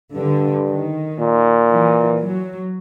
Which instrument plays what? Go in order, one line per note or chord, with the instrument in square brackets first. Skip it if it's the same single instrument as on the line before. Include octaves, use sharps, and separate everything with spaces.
[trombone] G2 [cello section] D3
[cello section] D#3
[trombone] A#2
[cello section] E3
F#3